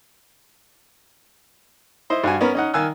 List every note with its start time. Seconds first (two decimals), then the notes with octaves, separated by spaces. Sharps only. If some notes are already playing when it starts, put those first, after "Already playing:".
2.10 E4 C5 D#5
2.24 G2 F#4 G#5
2.41 B3 C#4 A#4 B5
2.55 C#4 D#4 F#5
2.74 D#3 F5 G#5 E6 F#6